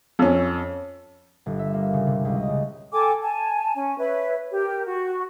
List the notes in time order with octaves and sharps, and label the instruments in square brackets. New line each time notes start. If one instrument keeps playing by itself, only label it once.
[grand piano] F2 C#4
[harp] G1
E5
A#3
C#3
C3
C#2
D#5
C#3
[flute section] A4 G5 G#5 D6
G#5 A5
C#4 G#5
B4 C#5 E5
G4 A#4
F#4